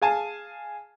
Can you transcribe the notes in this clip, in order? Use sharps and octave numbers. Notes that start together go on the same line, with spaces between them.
G#4 F5 G#5 A5